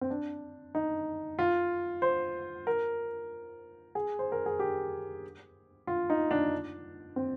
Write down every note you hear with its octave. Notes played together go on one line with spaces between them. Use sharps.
C4
D4
D#4
F4
C5
A#4
G#4
C5
A#4
G#4
G4
F4
D#4
D4
C4